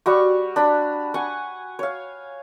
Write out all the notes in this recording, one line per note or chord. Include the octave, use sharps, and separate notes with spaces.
G3 F#4 C#6
D4 B5
F#5 G#5 C#6
C#5 F5